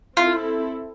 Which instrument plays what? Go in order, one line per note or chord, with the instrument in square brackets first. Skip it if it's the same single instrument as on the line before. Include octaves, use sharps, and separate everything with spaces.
[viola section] C4 E4 A4 [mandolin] F4